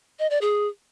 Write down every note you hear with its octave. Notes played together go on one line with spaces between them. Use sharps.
D#5
D5
G#4